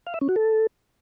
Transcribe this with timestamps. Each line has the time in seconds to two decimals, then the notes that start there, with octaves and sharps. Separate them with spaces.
0.07 F5
0.14 E5
0.21 C#4
0.29 F#4
0.36 A4